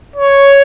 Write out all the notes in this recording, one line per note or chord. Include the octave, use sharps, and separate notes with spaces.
C#5